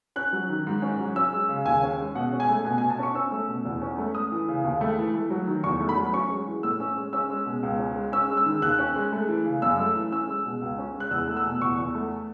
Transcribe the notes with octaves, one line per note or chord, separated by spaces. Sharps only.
C#4 F#6
F#3
D#3
G#2
C#4
F#3
C#4 E6
G#3
C#3
D#2 G#5
C#4
G#3
B2 F#5
C#4
G#5
A3
B2 G#5
G#5
B2
A5
C#4 C#6
C#4 E6
A3
B2
E2
C#4
A3
A3 D#6
E3
C#3
D#2
A3
E3
A3
F#3
D#3
E2 C#6
A3
B5
F#3
C#4 C#6
G#3
E3
A2 E6
C#4
G#3
C#4 E6
G#3
B2
C#2
C#4
G#3
C#4 E6
G#3
E6
D#3
D#2 F#6
C#4
G#3
A3
E3
C#3
F#2 E6
A3
E3
C#4 E6
G#3
B2
C#2
C#4
G#3
F#6
E2 E6
A3
E6
B2
E2 C#6
E2
A3